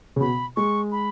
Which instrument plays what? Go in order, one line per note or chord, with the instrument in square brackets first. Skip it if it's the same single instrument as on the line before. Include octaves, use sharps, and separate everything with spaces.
[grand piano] C#3
[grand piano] B2 [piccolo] B5
[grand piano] G#3 [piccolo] C#6
[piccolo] B5